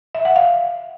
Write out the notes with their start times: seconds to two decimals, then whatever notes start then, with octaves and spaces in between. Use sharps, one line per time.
0.15 E5
0.25 F#5
0.36 F5